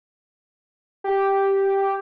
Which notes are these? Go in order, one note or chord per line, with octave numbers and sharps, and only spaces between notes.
G4